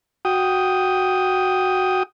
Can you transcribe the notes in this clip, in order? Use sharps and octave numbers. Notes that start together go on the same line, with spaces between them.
F#4 G5 D#6